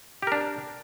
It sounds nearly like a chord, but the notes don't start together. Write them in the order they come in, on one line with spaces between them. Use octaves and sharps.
G4 A#4 D4